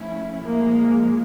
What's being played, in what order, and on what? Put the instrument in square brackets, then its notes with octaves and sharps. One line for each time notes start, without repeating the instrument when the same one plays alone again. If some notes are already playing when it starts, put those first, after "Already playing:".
Already playing: [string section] F3 A3 C#4 E4
[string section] A#2 F3 G#3 [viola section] A#3